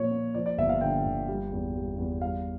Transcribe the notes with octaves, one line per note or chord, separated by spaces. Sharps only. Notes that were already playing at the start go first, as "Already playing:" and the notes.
Already playing: A#2 F3 A#3 C#5
A#3
F3 D5
D5
G1 E5
F5
D3 G5
G1
G3
E2
G3
E2
G3 F5